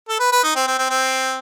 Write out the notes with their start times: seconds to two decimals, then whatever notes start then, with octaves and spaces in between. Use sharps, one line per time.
0.09 A4
0.20 B4
0.32 B4
0.44 D#4
0.56 C4
0.67 C4
0.79 C4
0.90 C4